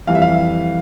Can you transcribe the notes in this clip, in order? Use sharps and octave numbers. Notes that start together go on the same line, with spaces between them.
F2 E3 G3 F5
E5
F5